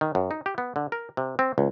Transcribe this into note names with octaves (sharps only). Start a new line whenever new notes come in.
D#3
F#2
D#4
G4
B3
D3
A#4
C3
C4
C#2